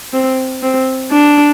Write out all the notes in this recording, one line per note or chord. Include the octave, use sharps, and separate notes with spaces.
C4
C4
D4